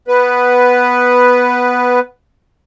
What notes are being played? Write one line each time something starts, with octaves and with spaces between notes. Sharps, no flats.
B3 B4